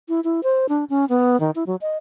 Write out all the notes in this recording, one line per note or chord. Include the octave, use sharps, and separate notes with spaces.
E4
E4
C5
D4
C#4
B3
D#3
E4
F#3
D#5